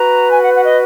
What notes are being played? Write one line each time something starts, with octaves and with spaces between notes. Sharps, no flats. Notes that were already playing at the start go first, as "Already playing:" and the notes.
Already playing: F#4 B4 A#5
G#5
F#5
F#5
D#5